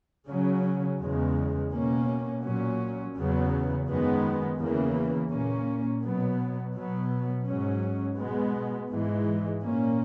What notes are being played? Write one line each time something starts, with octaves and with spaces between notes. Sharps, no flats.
C#3 F#3 C#4
E2 C#3 G#3
B2 A#3 C#4
A#2 F#3 C#4
E2 C#3 F#3 B3
F#2 D#3 G#3 B3
E2 C#3 E3 A#3
A#2 A#3 C#4
B2 F#3 B3
B2 F#3 B3
G#2 F#3 C#4
B2 G#3 B3
G#2 E3 G#3
A#2 A#3 C#4